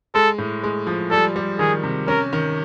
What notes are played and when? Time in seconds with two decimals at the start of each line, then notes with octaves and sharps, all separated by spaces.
0.15 G#3 A4
0.38 A2
0.64 G#3
0.87 F3
1.11 G3 A4
1.36 G3
1.59 D#3 G#4
1.84 C3
2.08 C#4 A#4
2.33 D#3